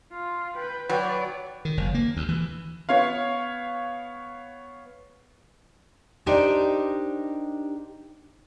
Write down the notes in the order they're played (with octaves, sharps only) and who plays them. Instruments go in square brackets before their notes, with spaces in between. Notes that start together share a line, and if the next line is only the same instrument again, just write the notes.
[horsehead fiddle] F4
B4 G5
[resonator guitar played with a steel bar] F#3 [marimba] B4 [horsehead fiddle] D5 [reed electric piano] G5 B5
[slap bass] D#3
F#1
A#3
D2
E3
[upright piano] B3 C#5 F5
[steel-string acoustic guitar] D4 D#4 G4 A#4 C5